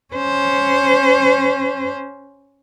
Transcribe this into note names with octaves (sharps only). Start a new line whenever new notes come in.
C#4 C5